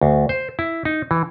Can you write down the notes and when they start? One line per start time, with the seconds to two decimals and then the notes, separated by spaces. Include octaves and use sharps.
0.02 D2
0.29 C5
0.59 E4
0.85 D#4
1.11 E3